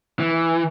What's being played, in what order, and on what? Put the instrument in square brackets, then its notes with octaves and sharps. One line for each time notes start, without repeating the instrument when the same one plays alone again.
[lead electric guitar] E3